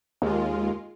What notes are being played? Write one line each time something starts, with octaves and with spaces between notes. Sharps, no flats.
D#2 G#3 F4